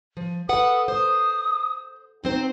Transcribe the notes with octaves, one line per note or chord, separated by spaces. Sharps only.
F3
A4 B4 F#5 D#6
C5 D#6
F#3 C4 D#4 C5